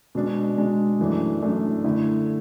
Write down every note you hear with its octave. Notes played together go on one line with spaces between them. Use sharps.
B2 G#3 D4
B2 G#3 D4
F#2 E3 A3 D4
F#2 E3 A3 D4
D3 A3 E4